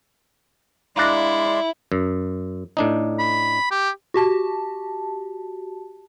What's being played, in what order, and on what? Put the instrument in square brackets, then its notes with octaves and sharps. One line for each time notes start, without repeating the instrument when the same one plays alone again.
[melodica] G#3 D5 C6 [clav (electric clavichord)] D4 F5 A#5 [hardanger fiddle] E4
[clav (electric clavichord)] F#2
A2 D4 D#4
[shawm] B5
G4
[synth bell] F#4 G4 A5